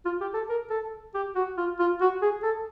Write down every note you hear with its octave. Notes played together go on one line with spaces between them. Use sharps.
F4
G4
A4
A#4
A4
G4
F#4
F4
F4
F#4
G#4
A4